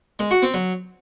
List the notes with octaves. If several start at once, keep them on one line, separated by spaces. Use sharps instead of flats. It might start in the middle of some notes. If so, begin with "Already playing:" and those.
G#3
F#4
C4
F#3